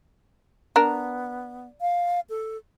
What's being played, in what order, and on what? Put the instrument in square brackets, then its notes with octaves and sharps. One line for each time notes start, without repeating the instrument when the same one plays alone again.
[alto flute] B3 [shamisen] D4 A#4
[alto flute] F5
A4